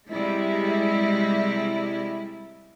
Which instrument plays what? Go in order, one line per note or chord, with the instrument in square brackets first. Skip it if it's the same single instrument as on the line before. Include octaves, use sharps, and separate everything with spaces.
[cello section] C3 G3 G#3 E4